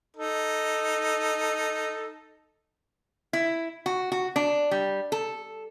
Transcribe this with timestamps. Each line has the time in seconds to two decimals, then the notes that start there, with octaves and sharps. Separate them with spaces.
0.17 D#4 A4
3.33 E4
3.86 F#4
4.12 F#4
4.36 D4
4.71 G3
5.12 A4